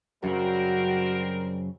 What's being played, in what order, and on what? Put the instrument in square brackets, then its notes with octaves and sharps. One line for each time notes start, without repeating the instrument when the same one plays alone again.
[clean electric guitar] F#2 C#3 F#3 [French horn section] G3 C4 A#4 [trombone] F#4